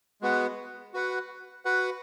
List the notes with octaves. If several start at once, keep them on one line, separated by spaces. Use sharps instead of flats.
G#3 B3 F#4 B4 F#5
F#4 B4 F#5
F#4 B4 F#5